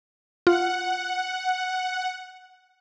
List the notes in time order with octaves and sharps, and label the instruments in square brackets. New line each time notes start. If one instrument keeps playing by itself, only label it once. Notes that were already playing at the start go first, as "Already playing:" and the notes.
[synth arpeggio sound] F4 [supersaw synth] F#5